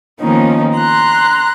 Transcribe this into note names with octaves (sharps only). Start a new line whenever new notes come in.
D#3 F3 A#3 B3 C#4 D#4
A#5 C6 F#6